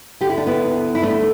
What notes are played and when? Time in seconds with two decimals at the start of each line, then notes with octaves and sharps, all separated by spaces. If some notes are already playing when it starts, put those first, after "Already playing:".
0.21 D3 G4
0.29 E4
0.37 D4
0.47 B3 E4
0.61 D2
0.95 E4
1.02 D3 A3 D4